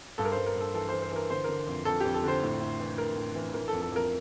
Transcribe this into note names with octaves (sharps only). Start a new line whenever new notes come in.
G2 A4
A#4
C5
G2
A#4
G2 A4
E3 A4
E3 C5
C5
E3 A#4
D3 C5
D3 A#4
F2
F2 A4
F2 G4
A4
D3 C5
A2
A2
E3
E3 A#4
A2
E3
E3 A#4
A4
F2
A4
F2 A#4